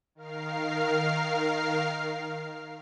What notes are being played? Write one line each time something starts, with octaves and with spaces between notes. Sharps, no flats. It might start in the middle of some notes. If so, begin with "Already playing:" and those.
D#3 A#4 F5 F6 C7